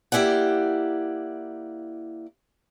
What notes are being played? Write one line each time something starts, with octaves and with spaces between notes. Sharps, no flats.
A#3 E4 G4 D5 F#5